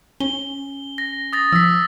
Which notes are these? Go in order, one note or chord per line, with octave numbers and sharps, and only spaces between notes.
C#4 G7
A#6
D#6 A6 A#6
F3 E6 B6